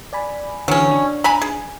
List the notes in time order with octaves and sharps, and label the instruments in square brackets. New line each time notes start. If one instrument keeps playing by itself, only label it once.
[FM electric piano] D5 G#5 B5
[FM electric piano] D3 E3 [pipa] F#3 C#4
[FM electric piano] D4
[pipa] G#5 A#5 B5
G#4